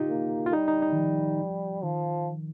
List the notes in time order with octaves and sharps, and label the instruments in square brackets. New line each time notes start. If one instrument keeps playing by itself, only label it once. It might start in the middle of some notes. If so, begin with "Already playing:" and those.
Already playing: [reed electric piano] D#4 F4 G4
[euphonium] A#3
[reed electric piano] F4
[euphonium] G3 [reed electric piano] D#4
[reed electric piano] D#4
D#4
D#3
F3
[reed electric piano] D#3 [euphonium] F3